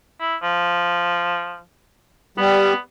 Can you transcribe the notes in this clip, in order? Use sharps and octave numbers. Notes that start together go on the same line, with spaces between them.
E4
F3
G3 B3